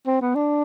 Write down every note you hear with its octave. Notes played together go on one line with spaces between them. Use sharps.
C4
B3
D4